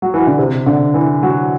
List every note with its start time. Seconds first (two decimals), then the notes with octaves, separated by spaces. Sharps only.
0.02 F#3
0.14 E3
0.27 D3
0.39 C3
0.66 D3
0.94 E3
1.23 F#3